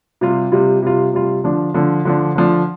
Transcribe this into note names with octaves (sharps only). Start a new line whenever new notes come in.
C3 G3 F4
C3 G3 F4
C3 G3 F4
C3 G3 F4
D3 F3 D4
D3 F3 D4
D3 F3 D4
D3 F3 D4